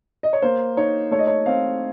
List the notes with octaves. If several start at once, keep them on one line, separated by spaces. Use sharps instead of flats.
D#5
C#5
A#3 C5
D#4 C#5
A3 C#5
D#5
C#5
C4 F5